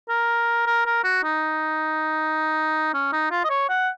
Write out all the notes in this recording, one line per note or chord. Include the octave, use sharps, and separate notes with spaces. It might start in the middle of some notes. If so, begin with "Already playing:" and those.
A#4
A#4
A#4
F#4
D#4
C#4
D#4
F4
D#5
C#5
F#5